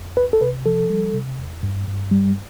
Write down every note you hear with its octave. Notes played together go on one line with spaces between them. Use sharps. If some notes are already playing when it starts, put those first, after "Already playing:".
Already playing: F2
C2 B4
A4
C3 B4
F3 A4
G3
C3
E2
G2
G2
G3